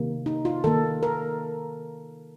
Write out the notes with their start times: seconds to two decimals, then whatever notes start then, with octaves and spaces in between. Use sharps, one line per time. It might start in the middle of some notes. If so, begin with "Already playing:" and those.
Already playing: C3 D#3 A#3
0.26 D#4
0.45 F4
0.64 D#3 A#3 A4
1.03 A#4